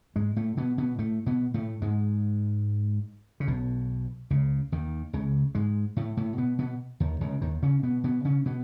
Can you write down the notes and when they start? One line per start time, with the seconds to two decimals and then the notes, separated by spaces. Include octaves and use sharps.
0.16 G#2 G#3
0.36 A2 A3
0.57 B2 B3
0.78 B2 B3
0.99 A2 A3
1.26 B2 B3
1.54 A2 A3
1.82 G#2 G#3
3.40 C#3
3.48 B1 B2
4.30 C#2 C#3
4.72 D#2 D#3
5.13 C#2 C#3
5.55 G#2 G#3
5.96 A2 A3
6.17 A2 A3
6.38 B2 B3
6.59 B2 B3
7.00 D#2 D#3
7.21 C#2 C#3
7.42 D#2 D#3
7.62 C#3 C#4
7.83 B2 B3
8.04 B2 B3
8.25 C#3 C#4
8.46 B2 B3